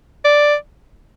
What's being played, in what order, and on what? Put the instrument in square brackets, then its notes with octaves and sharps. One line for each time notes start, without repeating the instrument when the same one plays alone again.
[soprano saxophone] D5